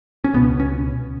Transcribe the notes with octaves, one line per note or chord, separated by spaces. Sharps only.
C#4
C#2 B2 B3
C#4